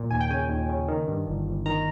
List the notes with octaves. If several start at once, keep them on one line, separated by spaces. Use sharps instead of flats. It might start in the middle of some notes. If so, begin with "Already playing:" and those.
Already playing: A#2
D#2 G#5
G5
C#3 G#5
D#2
C#3
D#3
G2
G1
G1
D#3 A#5